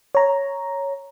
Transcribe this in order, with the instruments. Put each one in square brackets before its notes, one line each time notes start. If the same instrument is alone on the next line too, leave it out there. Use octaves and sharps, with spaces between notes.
[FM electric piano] C#5 A#5